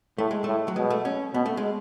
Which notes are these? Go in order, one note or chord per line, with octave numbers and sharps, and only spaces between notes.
A2 A3
G#3
A2 A3
F#3
B2 G#3
A3
C#4
B2 B3
A3
G#3